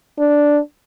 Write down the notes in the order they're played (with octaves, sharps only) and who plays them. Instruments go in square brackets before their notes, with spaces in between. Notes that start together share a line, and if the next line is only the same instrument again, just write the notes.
[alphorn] D4